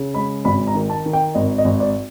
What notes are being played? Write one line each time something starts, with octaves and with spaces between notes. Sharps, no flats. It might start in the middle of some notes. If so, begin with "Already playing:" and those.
Already playing: C#3
G#3 B5
G#1 B5
A#5
D#3
A5
D#3
G5
G#1 D#5
D#5
G#1
D5